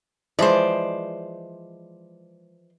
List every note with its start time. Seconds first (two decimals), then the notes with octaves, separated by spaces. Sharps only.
0.39 E3 F3 G#3 C5 D5